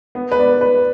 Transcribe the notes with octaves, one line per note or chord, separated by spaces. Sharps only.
B3
B4
D5
B4